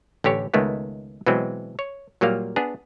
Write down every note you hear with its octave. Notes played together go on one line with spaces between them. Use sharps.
A1 D3 G4 C#5
C#2 D#3 G#3 A3 B3
B2 E3 F#3 G#3 C4
C#5
A#2 F#3 G3 A#3 F5
B3 D4 G#4